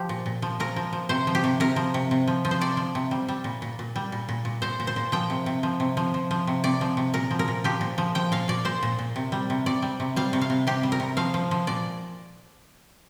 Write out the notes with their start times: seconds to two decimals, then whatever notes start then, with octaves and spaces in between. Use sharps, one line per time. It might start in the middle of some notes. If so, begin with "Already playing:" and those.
Already playing: F3 G4
0.09 A#2
0.26 A#2
0.42 F3
0.60 A#2 A#4
0.76 F3
0.93 F3
1.09 C3 C5
1.27 F3
1.35 G4
1.44 C3
1.60 C3 A#4
1.76 F3
1.94 C3
2.11 C3
2.27 F3
2.45 F3
2.51 C5
2.61 C3 D5
2.77 F3
2.95 C3
3.11 G3
3.28 G3
3.44 A#2
3.62 A#2
3.79 A#2
3.96 G3
4.12 A#2
4.29 A#2
4.45 A#2
4.62 A#2 C5
4.80 A#2
4.87 C5
4.96 A#2
5.12 F3 G5
5.30 C3
5.46 C3
5.63 F3
5.80 C3
5.97 F3
6.14 F3
6.31 F3
6.47 C3
6.64 C3 D5
6.81 F3
6.97 C3
7.14 A#2 A#4
7.31 F3
7.39 A#4
7.48 A#2
7.64 F3 G4
7.81 A#2
7.98 F3
8.15 F3 G5
8.32 A#2 F5
8.48 A#2 D5
8.65 A#2 C5
8.83 A#2
8.99 A#2
9.16 C3
9.32 G3
9.50 C3
9.66 C3 D5
9.82 G3
10.00 C3
10.16 G3 F5
10.33 C3
10.41 F5
10.50 C3
10.67 C3 G4
10.83 G3
10.92 A#4
11.00 C3
11.17 F3 F5
11.34 F3
11.51 F3
11.67 A#2 D5